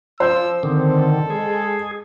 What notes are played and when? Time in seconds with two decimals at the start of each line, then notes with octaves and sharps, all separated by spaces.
0.20 F3 C5 E6
0.63 D3 D#3 C4 A4
1.30 G#3 G#4